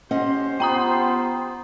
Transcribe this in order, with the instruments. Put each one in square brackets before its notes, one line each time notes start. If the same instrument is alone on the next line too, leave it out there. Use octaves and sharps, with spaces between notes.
[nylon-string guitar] C#4 D#5 F#5 [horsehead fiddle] G4 C5
[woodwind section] B3 F4 [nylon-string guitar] F#5 [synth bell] G5 A#5 D#6